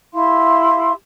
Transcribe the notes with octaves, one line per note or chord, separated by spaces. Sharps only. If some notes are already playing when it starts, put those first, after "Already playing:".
E4 G4 F5 C6